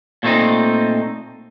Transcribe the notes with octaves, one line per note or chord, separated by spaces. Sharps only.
A#2 A3 C4 D#4